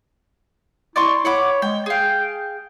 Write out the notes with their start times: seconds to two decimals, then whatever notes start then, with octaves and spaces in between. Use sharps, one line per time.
0.96 E4 D5 C6 C#6
1.25 C#5 F#5 B5 D6
1.62 G#3 G5
1.86 G#4 F5 G5